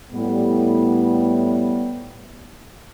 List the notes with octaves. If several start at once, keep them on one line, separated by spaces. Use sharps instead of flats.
A2 G3 B3